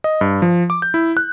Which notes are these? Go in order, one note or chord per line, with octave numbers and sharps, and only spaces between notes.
D#5
G2
F3
D6
G6
E4
F#6